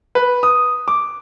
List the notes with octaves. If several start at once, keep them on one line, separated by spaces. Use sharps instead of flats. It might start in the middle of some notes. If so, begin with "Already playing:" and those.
B4
D#6
D6